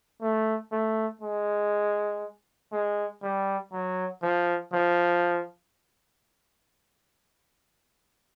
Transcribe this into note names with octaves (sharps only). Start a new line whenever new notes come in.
A3
A3
G#3
G#3
G3
F#3
F3
F3